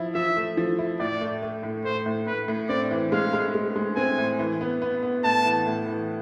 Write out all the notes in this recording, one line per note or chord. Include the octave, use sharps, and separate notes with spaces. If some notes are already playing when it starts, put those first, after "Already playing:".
Already playing: F3 E4
F3 E5
A3
F3
E4
A2 D5
A3
A3
A2
A3 C5
A2
A2 B4
A2
C4 D5
E3
G#3 F5
G#3
G#3
G#3
C4 G#5
A2
E3
B3
B3
B3
A2 A5
E3
A2
E3